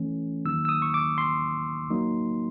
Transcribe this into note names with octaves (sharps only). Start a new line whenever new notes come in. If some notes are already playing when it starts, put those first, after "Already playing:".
Already playing: E3 A3 C#4
D#3 F#3 A#3 D#4 E6
E6
D#6
C#6
D6
C6
F#3 A#3 D#4